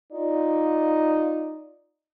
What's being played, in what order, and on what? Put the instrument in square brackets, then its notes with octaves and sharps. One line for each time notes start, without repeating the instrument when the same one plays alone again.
[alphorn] D#4 [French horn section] F4 D5